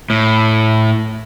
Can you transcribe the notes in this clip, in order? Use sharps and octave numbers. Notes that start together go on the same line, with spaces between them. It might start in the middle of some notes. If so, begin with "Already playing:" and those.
A2